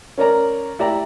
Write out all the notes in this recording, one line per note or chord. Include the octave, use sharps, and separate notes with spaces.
C#4 A#4 D5 A#5
E4 G4 D5 E5 A#5